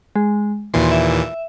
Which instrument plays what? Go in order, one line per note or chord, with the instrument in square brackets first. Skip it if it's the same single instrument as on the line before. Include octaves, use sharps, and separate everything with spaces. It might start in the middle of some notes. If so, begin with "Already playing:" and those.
[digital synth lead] G#3
[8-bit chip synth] D#2 A#2 E3 [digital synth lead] C6
[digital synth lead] E5